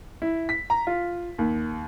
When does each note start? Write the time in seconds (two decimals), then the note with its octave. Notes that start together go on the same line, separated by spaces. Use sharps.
0.22 E4
0.49 B6
0.70 A#5
0.87 F4
1.38 D#2